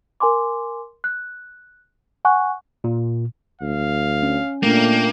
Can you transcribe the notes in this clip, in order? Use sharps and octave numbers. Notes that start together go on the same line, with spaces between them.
A#4 G#5 C6 D6
F#6
F#5 G#5 C#6 F#6
A#2
D2 F5
C#4
A#2 A3 A#3 D4 G5